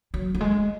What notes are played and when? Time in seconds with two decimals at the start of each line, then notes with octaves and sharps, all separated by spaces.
0.14 F#3
0.35 F#3
0.40 G#3